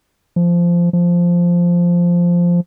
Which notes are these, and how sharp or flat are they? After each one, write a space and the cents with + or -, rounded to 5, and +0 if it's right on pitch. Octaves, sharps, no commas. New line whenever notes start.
F3 -15
F3 -5